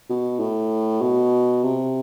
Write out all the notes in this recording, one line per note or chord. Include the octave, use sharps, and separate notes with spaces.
B2
A2
B2
C3